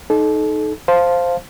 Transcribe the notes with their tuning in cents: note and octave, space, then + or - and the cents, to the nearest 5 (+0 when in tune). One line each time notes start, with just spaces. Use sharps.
D#4 -5 A4 -30
C5 +0 F5 +0 A5 +5